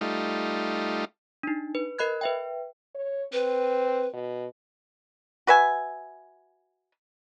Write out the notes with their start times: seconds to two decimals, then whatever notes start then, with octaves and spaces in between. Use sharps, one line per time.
0.01 G3 A3 D#4 F4
1.43 D4 D#4
1.75 B4
1.99 A#4 D#5 B5 F#6 G#6
2.21 B4 E5 G5
2.95 C#5
3.33 C4 B4
4.13 B2
5.47 F#4 B4 E5 G#5